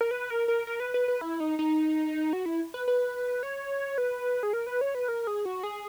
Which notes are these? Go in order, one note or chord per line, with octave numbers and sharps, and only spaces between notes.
A#4
B4
A#4
A#4
A#4
B4
B4
B4
E4
D#4
D#4
F#4
E4
B4
B4
C#5
B4
G#4
A#4
B4
C#5
B4
A#4
G#4
F#4
G#4